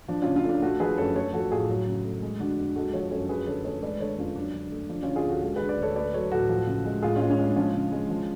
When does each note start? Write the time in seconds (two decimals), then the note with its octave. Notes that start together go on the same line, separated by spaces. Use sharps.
0.08 F3 D4
0.22 C#3 C#4 F4
0.36 C#4 F4
0.45 A3 D4
0.62 A3 F#4 A4
0.80 F3 G#4 B4
0.97 F#2 A4 C#5
1.16 A3 A4 C#5
1.33 F3 F#4 A4
1.51 A2 F4 G#4
1.70 F#3
1.86 C#3
2.05 A3
2.22 G#3
2.40 D3 D4 F#4
2.58 F2
2.76 G#3 F#4 A4
2.93 F3 A4 C#5
3.11 F#2 A4 C#5
3.29 F#3 G#4 B4
3.47 D3 A4 C#5
3.64 A3 A4 C#5
3.82 G#3 B4 D5
4.00 D3 A4 C#5
4.18 F2 C#4 F4
4.36 F#3 D4
4.53 D3
4.72 A3
4.89 F3 D4
5.03 D3 C#4 F4
5.16 F4 G#4
5.25 D2 F#4 A4
5.42 G#3 F#4 A4
5.56 G#4 B4
5.61 D3
5.69 B4 D5
5.78 D2 A4 C#5
5.95 A3 B4 D5
6.13 F#3 A4 C#5
6.32 A2 F#4 A4
6.49 F3
6.67 C#3
6.85 G#3
7.02 A2 F4 G#4
7.16 G#3 C#4 F4
7.30 C#4
7.38 G#3
7.43 D4
7.56 F3 C#4 F4
7.74 C#3
7.92 G#3
8.10 F3